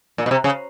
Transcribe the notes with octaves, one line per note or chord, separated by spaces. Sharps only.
A#2
B2
C3
C#3